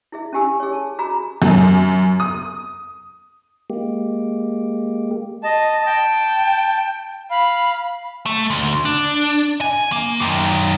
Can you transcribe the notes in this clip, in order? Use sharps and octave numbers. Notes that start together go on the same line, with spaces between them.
E4 G#4 E5
C#4 E4 G4 G#5 E6
G#4 C#5
A5
F#4 G#4 A#5 B5 D6
F#2
D#6
G#3 A#3 G4
D#5 A5
G5
F5 B5
A3
D2
D4
G#5
A#3
F#2 D#3